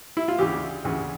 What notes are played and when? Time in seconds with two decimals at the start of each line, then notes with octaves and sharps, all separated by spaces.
0.17 E4
0.28 F4
0.39 D2 C#3 E3 G4
0.85 D2 C#3 E3